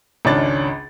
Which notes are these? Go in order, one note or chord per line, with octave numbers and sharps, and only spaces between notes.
G#1 C#2 C#4 D4 A6